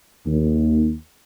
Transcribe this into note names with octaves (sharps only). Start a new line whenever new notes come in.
D#2